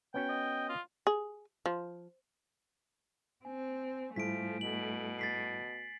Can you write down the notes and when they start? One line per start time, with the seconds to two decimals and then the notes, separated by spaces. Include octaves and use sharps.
0.14 B3 C#4 F#4 G5
0.29 D#5
0.69 F4
1.07 G#4
1.66 F3
3.45 C4 G#5
4.16 G#2 F3 G3 A3 E4 B6 D7
4.61 B2 F#7
5.19 A6 B6 C7